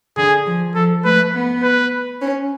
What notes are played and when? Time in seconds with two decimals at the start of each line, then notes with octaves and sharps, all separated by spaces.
0.17 D3 G#4
0.46 F3
0.75 F3 A4
1.04 A3 B4
1.34 B3
1.63 B4
2.21 C#4